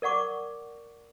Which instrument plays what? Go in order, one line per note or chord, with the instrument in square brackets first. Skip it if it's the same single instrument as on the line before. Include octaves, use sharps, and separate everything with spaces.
[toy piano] A#4 D5 F#5 C#6 D6